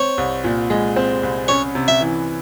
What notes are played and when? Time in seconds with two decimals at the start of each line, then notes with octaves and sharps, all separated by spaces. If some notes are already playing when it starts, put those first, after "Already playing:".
Already playing: C4 C#5
0.17 C2
0.44 A#2
0.70 G#3
0.96 C4
1.23 C2
1.48 C#4 C#5
1.75 C3
1.88 E5
2.01 E3